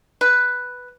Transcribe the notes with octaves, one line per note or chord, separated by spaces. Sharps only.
B4